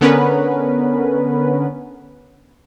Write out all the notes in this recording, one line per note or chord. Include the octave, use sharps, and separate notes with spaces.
D3 B3 C#4 A#4 B4